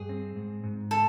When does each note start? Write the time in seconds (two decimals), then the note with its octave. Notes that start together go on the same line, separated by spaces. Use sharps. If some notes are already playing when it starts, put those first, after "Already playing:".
Already playing: G2 G#4
0.09 C4
0.36 G#2
0.63 G#2
0.91 D3 A4